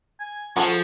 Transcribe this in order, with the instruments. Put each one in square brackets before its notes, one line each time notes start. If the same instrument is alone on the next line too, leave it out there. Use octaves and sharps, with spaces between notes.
[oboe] G#5
[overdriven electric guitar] F3 [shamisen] F#4 G#4 A4 [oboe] C#6